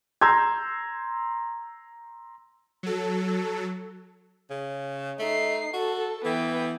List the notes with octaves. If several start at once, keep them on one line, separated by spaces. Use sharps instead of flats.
A#5 C6 E6 G6 G#6
F#3 A4
C#3
A3 D#4 C7
F#4 A4
E3 B3 G5